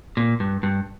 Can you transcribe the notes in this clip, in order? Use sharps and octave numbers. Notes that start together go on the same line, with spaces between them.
A#2
G2
G2